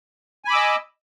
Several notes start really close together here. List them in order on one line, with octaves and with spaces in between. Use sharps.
G#5 B5 D6 E6 D#5